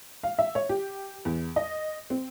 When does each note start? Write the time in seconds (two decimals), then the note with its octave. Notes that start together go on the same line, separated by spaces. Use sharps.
0.23 F5
0.39 E5
0.55 C#5
0.69 G4
1.25 E2
1.56 D#5
2.10 C4